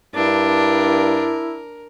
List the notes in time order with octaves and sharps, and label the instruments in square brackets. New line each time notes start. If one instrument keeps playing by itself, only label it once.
[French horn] G2 [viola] D4 [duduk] E4 [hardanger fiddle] A#4